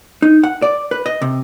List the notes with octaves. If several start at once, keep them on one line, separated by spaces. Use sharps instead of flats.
D#4
F#5
D5
B4
D#5
C3